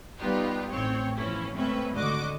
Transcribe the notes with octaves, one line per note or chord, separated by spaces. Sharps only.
G3 B3 D#4 F4 G4
A1 C4 C#5
G1 E3 F3 C#4 E4
G#3 A3 C4 C#4 B4 E5
G#1 D2 D3 F#4 D#5 D6